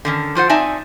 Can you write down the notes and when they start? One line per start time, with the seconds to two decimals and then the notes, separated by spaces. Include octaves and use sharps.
0.05 D3 D#3 C#4
0.35 F3 F4 C5 F#5
0.49 C4 D#4 D5 E5 G#5 A5